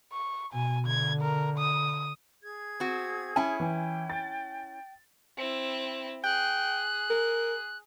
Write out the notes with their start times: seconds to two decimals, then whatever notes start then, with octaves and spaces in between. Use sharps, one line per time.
0.13 C#6
0.53 B2 G#5
0.87 D3 G#6
1.22 A#4
1.58 D#6
2.43 G#4 G#6
2.80 C4 F#4
3.36 C#4 E4 G#5
3.60 E3 G5
4.10 A6
5.37 C4 E4
6.24 G#4 G5 F#6
7.10 A#4